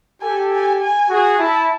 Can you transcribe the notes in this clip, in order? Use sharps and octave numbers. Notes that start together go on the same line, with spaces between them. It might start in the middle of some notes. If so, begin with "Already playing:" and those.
G4 A4 G#5
G#5
G#5
F#4 G#4
E4 A5